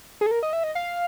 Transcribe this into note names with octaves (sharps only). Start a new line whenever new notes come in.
G#4
A4
A#4
D#5
E5
D#5
F5